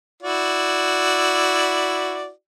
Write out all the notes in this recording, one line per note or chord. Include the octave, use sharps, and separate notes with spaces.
E4 F#4 D5